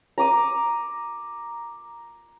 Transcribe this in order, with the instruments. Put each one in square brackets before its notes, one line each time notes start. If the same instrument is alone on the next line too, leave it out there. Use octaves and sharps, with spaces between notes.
[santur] A#5 D6 D#6